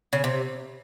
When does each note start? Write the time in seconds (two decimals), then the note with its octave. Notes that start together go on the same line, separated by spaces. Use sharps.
0.13 C#3
0.24 C3